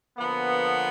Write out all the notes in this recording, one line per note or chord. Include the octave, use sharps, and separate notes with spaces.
D3 F3 A#3 B3